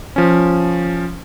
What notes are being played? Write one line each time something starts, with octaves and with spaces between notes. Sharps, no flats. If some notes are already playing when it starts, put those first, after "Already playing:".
F3 C#4